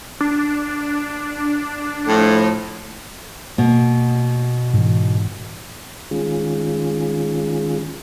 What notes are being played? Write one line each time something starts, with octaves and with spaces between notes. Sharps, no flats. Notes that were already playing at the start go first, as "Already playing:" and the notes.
D4
A2 F3
B2 A#3
G#2 E3
D#3 G#3 C#4 F4 G#4